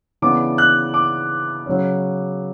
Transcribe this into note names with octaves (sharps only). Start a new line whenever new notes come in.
C#3 E3 B3 D4 D6
F#6
D6
C#3 F#3 C#4